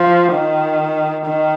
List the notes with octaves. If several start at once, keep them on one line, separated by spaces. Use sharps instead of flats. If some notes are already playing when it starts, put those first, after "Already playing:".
Already playing: F3
D#3
D#3